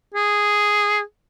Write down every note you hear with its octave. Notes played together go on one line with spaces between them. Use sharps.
G#4